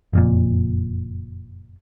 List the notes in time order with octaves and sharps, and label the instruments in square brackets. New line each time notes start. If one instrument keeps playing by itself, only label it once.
[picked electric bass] F#1 F2 A#2